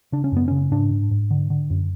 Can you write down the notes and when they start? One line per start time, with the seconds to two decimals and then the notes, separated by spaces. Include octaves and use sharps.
0.12 C#3 D4
0.24 C#4
0.32 F#2 B3
0.48 C#3 C#4
0.72 G#2 D4
0.91 G#2
1.11 G#2
1.31 D3
1.50 D3
1.70 F#2